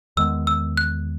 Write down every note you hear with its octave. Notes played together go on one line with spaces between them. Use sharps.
E2 D#3 G#3 B3 E6
E6
F#6